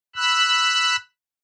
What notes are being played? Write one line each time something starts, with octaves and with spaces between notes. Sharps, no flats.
B5 E6 F#6